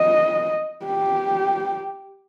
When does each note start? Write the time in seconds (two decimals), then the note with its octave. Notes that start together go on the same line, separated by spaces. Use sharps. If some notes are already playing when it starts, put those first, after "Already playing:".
Already playing: D#5
0.86 G4